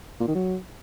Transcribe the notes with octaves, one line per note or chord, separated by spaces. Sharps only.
A#2
D#3
F#3